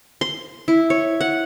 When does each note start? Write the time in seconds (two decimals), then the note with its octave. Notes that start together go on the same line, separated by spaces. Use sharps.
0.21 C6
0.68 E4
0.90 C#5
1.21 F#5